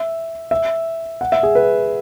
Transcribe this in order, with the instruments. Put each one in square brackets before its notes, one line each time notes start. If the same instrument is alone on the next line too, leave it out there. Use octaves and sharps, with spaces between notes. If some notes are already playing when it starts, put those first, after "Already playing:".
Already playing: [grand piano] E5
E5
F#5
E5
G#4
B4